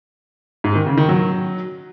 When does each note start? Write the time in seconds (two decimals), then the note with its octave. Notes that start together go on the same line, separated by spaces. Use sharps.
0.64 G#2
0.75 D#3
0.86 C#3
0.97 D#3
1.09 F#3